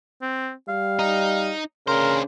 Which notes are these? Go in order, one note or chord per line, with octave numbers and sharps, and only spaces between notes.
C4
G3 F5
D#4
C#3 D4 A#4 C5